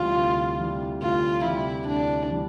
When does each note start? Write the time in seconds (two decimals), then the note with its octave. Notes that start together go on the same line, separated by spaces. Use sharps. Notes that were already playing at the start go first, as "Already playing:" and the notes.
Already playing: D2 C3 E3 G3 F4
0.17 D2
0.59 C3 E3 G3
1.02 D2 F4
1.45 C3 E3 G3 E4
1.88 D2 D4
2.31 C3 E3 G3